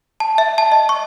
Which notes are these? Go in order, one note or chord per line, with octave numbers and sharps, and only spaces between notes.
A5
E5
A5
D#5
C#6